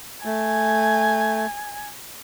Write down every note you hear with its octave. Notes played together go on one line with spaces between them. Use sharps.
A3 G#5